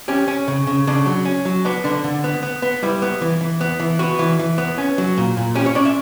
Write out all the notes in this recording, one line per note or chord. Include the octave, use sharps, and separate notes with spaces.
C#4 G4
C#4
C#3
C#3
C#3 D4
F#3
C#4
F#3
B3 D4
D3 D4
D3
B3
B3
B3
G3 E4
B3
E3
E3
B3
E3
B3 F#4
E3
E3
B3
C#4
F#3
A#2
A#2
C#4 G4
C#5
C#4 D5
E5